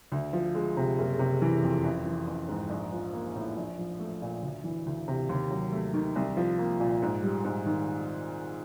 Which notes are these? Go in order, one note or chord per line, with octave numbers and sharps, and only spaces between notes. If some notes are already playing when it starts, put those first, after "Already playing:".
D2
F3
G#3
C3
F#1
C3
E3
F2
A1
E3
A1
G#2
A#1
F3
A#3
A2
A#1
F3
A3
A#2
D2
E3
D2
C3
D#2
F#3
A3
D#3
C2
F3
A#3
A#2
G#2
G3
G#2
D#3